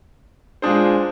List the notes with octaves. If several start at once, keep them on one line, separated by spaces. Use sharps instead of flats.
A#2 G#3 D4 G#4 C5